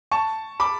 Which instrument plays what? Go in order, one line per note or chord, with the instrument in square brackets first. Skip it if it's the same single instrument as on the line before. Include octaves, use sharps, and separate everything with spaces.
[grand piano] A5 C#6
B5 D6